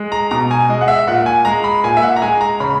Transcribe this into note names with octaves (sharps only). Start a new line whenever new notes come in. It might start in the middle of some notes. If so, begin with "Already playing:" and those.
Already playing: G#3
A#5
B2 A#5
G#5
G#3 D#5
F#5
E5
A#2 F#5
G#5
G#3 A#5
B5
A#2 G#5
E5
F#5
A#5
G#3 G#5
A#5
C#3 B5